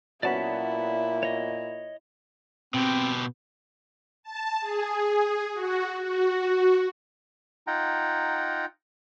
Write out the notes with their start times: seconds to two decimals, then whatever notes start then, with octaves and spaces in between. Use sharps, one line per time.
0.23 A#2 F#3 B3 C#4 E4 D5 A5 B5
1.23 C#5 D#5
2.74 B2 C4 G4
4.23 A5
4.60 G#4
5.54 F#4
6.02 F#4
7.67 D#4 F4 F#5 G5 A#5